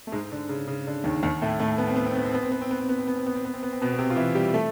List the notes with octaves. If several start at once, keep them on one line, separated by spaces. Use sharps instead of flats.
A3
G#2 G#3
D3
C#3
C#3
D3
D#2 D#3
D#2 D#3
A2 A3
A2 A3
B3
C4
B3
C4
B3
C4
B3
C4
B3
C4
B3
C4
B3
C4
B3
C4
B3
C4
B3
C4
B3
C4
B2 B3
B3
C3 C4
F4
E3 E4
G3 G4
A3 A4